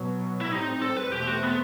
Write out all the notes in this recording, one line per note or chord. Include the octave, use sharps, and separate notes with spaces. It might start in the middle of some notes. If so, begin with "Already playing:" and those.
Already playing: B2 F#3 B3
E4
A2 G3 C4 D#4
A4
B4
E2 B2 A3 C4 G4
F#4
B3